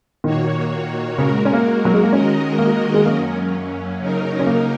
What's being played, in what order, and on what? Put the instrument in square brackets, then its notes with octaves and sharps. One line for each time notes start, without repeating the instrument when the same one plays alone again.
[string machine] A#2 A#3 F#4 C#5 [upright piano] D#3
[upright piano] C#3 [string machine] G#3 F#4 A#4
[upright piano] C#4
A#3
F#3
G#3
A#3
[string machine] D#3 G#3 F#4 A#4 D#5 [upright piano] C#4
[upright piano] A#3
G#3
[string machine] F#2 F#3 C#4 [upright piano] A#3
[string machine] C#3 F#3 D#4 A#4
[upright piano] C#4
A#3